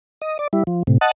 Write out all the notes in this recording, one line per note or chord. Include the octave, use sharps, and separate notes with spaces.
D#5
D5
G3 E4
F3
A2 C3
D#5 F#5 A5